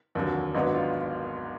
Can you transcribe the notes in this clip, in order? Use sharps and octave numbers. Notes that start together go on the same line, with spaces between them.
F1 D#2 D3 F#3
G#1 G#2 F#3 B3 D4 D#4
F4